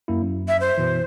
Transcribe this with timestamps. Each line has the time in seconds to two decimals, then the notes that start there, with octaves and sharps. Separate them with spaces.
0.08 F#2 A#3 E4
0.23 F#2
0.48 E5
0.60 C5
0.78 B2 E3